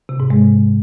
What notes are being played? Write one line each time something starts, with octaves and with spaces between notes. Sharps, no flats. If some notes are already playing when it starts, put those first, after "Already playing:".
C3
G#2
G#3